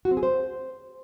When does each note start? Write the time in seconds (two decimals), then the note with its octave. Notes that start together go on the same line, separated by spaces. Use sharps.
0.05 F#4
0.11 C4
0.17 G#4
0.23 C5